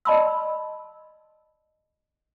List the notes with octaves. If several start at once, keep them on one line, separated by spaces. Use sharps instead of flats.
D5 D#5 A5 B5 C6 E6